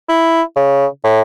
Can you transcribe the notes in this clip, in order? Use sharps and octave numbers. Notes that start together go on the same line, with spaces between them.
E4
C#3
A2